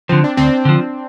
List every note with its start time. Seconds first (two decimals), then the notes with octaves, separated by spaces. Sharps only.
0.09 D3 F3 C4
0.24 D4
0.37 D2 C4
0.65 D3 F3